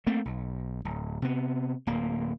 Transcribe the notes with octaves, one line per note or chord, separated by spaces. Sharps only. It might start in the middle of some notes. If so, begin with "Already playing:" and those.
A3 A#3 C4
B1
D1
C3 B3
D1 A#3